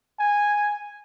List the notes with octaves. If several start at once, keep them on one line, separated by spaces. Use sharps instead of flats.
G#5